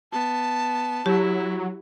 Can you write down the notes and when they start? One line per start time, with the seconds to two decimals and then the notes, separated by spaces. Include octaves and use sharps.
0.12 B3 A5
1.06 F#3 E4 G4